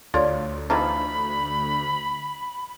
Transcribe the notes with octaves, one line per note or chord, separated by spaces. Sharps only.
D2 F4 C#5 D5
E3 F3 D#4 B5